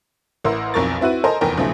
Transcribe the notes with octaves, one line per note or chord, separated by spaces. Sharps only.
A1 E4 A#4 C6 E6
B1 F2 A#4 C#6 A6
C4 E4 F#4 B4 D#7
A4 A#4 C5 D#5 G#5 A#5
F1 E2 A#4 G5
B1 C#3 F3 A3